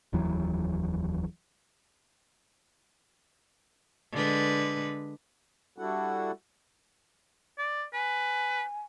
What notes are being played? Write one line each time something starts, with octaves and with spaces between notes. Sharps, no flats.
F1 D#2 E3 F#3
D3 G#3 B4
G3 D4 E4 F#4 A4 F#5
D5
B4 G#5